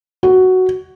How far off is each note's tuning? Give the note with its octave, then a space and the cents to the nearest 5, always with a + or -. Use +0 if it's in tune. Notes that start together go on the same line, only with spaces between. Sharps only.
F#4 +5